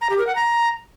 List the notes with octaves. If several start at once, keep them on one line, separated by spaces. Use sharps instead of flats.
A#5
G4
A#4
F#5
A#5